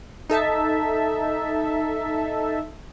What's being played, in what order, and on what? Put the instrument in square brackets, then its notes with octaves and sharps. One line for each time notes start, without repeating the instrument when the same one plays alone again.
[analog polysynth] D#4 A4 E5 A5